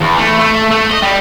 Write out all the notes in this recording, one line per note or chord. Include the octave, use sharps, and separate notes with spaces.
E2
A3
A3
A3
D#5
G3